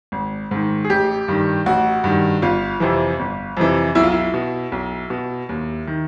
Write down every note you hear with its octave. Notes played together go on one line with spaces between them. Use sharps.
G#1
G#2 D#3
G#4
A1 G4
G2 D#3
A1 F#4
G2 D#3
G1 F4
F2 C3 E3
G1
F2 C3 E3
B1 E4
F4
E4
B2
B1
B2
D#2
D#3